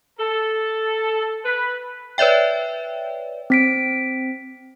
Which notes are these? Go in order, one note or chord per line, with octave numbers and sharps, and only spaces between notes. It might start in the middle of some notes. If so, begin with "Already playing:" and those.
A4
B4
B4 C#5 D5 E5 G5
C4 B6 D7